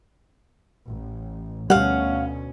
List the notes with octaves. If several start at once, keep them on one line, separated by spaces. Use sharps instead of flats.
A1
D2 B2 G3 C#4 F5 F#5